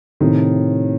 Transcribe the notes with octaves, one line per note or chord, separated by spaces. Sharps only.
A2 C3 D#3